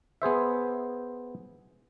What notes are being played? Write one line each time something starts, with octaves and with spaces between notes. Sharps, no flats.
B3 G#4 C5 E5